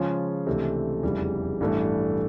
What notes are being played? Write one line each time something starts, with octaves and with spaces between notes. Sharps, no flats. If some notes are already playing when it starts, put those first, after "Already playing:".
Already playing: C#3 F3 G#3 C#4 F4
C#2 C3 E3 A3 D4
F1 E2 C#3 E3 G3
A1 G2 E3 A3 D4